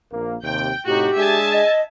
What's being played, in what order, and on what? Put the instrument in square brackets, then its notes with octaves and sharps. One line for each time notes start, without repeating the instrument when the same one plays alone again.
[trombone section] A#1 A#3
[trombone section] D#2 C3 [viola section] G5
[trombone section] A2 C3 D#4 [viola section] F#4 [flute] G4
[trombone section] G#3 D4 G#4 [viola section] E5 G#5 A5
[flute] D#5